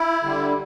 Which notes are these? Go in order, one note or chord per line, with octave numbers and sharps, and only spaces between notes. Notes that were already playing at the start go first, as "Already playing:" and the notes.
Already playing: E4
D3 G3